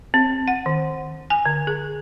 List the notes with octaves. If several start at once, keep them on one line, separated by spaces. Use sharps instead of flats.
C4
F#5
D#3
G#5
D3
G#4